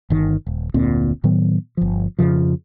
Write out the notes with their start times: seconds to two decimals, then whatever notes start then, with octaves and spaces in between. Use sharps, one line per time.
0.10 G1 D#3
0.47 D#1
0.74 F1 D2 A#2 C4
1.24 A2 D#3 F#3 B3
1.77 G1 F3
2.19 F2 C#3 F3